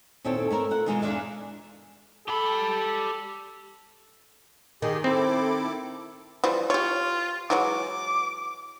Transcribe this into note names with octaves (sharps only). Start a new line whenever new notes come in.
D#2 A#2 C4 E4 A4 C#5
A3 E4 A#4
F4 F#5
B2 D#3 E3 G#3 D#4 F4
E2 G#2 D4 E4 E5 F5
G4 A4 B5
D#3 G4 G#4
C4 E4 A4 D6
E3 F3 G3
F4 G4 C#5
E3 F#3 G#3 D6